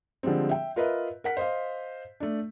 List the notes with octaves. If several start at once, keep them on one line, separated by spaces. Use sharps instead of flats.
D3 F3 G3 G#3 C4
E5 G5
F4 A#4 B4 D#5 E5
A#4 F#5 B6
C5 D#5 F5
A3 D4